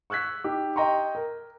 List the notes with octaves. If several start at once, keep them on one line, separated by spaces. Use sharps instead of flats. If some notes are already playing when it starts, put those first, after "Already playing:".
C#6 E6 F#6 G#6 B6
D#4 G4
D#5 G5 A#5 C6 C#6
A#4